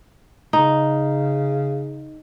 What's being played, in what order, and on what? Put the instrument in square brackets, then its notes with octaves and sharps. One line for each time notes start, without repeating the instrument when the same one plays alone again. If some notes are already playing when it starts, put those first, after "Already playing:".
[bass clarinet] C#3 [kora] D#4